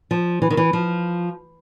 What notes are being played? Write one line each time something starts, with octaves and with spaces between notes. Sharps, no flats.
F3
E3
D#3
E3
F3